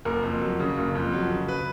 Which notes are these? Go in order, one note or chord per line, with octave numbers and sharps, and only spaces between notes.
F#1 A#4
F2
F#3
C#3
F#1
F2
F#3
C#3
B4